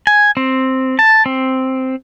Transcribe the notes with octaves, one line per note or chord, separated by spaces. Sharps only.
G#5
C4
A5
C4